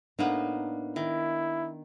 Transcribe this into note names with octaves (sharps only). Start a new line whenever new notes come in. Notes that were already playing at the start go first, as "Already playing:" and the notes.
A2 A#3 B3 D4 D#4
D#3 E4